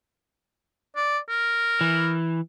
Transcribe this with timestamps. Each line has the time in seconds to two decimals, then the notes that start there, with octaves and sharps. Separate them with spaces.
0.96 D5
1.29 A#4
1.81 E3